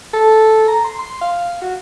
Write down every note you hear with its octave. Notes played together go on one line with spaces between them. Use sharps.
A4
A#5
C6
C6
F5
F#4